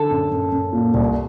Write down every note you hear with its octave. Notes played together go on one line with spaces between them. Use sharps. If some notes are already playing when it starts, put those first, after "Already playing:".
Already playing: D3 A4
F#2
F#2
F#2
A#2
C2